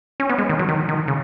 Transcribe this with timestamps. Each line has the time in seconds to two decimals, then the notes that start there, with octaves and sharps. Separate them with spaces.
0.20 C#4
0.29 B3
0.38 G#3
0.49 D#3
0.59 F#3
0.69 D#3
0.89 D#3
1.08 C#3